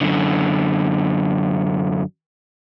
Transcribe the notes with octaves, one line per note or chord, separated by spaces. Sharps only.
F#2 D3